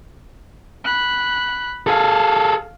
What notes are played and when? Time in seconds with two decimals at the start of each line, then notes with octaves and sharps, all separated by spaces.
0.85 B5 F#6
1.87 G#4 A4 F5